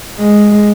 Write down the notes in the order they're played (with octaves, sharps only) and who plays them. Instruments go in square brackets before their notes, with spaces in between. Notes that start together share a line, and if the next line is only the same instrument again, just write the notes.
[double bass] G#3